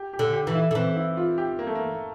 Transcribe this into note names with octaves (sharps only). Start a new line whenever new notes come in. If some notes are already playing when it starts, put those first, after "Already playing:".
Already playing: G4
G4
D3
G4
E3
E4
D3
E3 C4
E4
F4
G4
A#3
A3
A#3